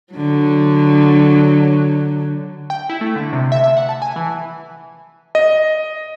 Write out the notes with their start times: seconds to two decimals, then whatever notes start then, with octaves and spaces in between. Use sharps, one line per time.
0.14 D3 F#3
2.70 G5
2.89 E4
3.01 A3
3.16 D3
3.33 C3
3.52 E5
3.64 E5
3.77 F#5
3.89 A5
4.02 G#5
4.16 E3
5.35 D#5